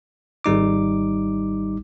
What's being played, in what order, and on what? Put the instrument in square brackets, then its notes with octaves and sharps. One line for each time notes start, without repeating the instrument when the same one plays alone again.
[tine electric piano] G#1 G3 D#4 D6